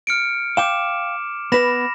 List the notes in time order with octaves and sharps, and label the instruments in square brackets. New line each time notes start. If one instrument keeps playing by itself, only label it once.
[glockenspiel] F6 C#7 D7
[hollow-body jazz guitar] F5 G5 [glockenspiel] D6 E7
[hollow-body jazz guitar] B3 B4 [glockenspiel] B5 A#6 E7